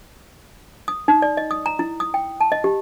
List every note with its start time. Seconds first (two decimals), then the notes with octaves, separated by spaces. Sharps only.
0.88 D#6
1.08 D#4
1.22 D5
1.37 D#5
1.51 D#6
1.66 A#5
1.79 E4
2.00 D#6
2.14 G5
2.40 A5
2.52 D#5
2.64 G4